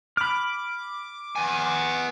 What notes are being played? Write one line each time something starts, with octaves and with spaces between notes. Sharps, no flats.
B5 D6 F6
B3 G#5